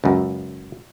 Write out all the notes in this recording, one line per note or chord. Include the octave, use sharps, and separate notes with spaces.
C#2 F#2